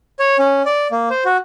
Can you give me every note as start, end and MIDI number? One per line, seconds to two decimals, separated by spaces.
0.19 0.37 73
0.39 0.62 61
0.65 0.88 74
0.92 1.09 58
1.10 1.24 72
1.25 1.37 66